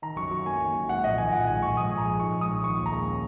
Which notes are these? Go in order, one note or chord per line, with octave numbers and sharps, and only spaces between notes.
D#3 A#5
F#2 C#6
F#3 C#6
A#3 G#5
D#3
F#2
G#2 F#5
A#1 D#5
D#3 G#5
A#1 F#5
G#2 G#5
A#1 C#6
G#2 D#6
A#1 G#5
A#5
G#3
D#4 C#6
G#2
D#6
A#1
D#3 C#6
D#2
A#5
G#3
C#4